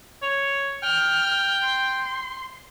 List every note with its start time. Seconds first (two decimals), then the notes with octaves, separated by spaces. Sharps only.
0.22 C#5
0.83 G5 F6
1.63 C6